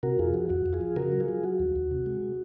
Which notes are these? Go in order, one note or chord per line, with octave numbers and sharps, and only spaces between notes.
C3 F#4 A#4
F2 F4 G#4
F3 F#4
F2 F#4
F2
F4 G#4
F3
C#3 F#4 A#4
F#3
F4 G#4
F#3
F#3 F#4
D#2
D#2
C3
G#3